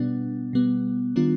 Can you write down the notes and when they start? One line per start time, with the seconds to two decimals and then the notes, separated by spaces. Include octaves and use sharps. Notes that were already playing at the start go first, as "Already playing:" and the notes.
Already playing: B2 G3 B3 D4
0.53 B2 G3 B3
1.16 D#3 G3 B3 D4 F4